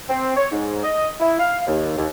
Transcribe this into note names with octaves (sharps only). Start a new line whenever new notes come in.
C4
C#5
G#2
D#5
E4
F5
D#2
D#2